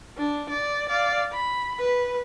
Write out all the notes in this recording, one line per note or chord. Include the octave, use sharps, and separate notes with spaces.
D4
D5
D5 F5
B5
B4